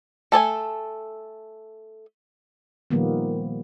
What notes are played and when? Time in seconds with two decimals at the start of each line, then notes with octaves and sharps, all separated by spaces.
0.32 A3 A4 C#5 G#5
2.91 A#2 D#3 F3 G3 A#3 B3